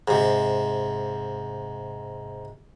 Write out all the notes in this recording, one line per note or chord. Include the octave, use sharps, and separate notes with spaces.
G#2 C3